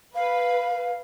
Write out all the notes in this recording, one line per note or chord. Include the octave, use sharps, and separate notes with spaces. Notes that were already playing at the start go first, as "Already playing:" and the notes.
B4 F5